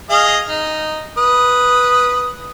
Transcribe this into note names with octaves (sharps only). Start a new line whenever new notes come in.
G#4 D#5 F5
D#4
B4 D#6